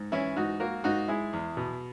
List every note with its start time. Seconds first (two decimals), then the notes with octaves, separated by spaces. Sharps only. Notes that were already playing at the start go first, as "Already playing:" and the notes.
Already playing: G#2
0.12 E3 C#4 E4
0.36 G#2 D#4 F#4
0.60 A#3 F#4 A#4
0.84 G#2 D#4 F#4
1.08 G#3 E4 G#4
1.33 E2
1.57 B2